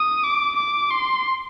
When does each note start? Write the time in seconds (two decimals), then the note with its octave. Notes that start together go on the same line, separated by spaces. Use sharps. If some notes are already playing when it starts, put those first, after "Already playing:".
Already playing: D#6
0.24 D6
0.57 D6
0.91 C6